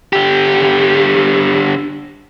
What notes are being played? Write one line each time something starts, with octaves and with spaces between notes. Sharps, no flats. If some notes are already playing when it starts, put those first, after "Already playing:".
D3 G4